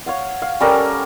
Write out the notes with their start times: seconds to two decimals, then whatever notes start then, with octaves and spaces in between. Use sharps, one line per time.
0.06 C#5 F5 F#5
0.42 F5
0.60 G3 C#4 A4 A#4